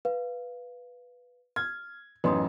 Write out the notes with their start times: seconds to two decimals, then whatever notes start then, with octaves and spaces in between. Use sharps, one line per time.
0.05 B4 F5
1.56 F6 G#6
2.24 A1 F#2 D#4 B4 C6 D#6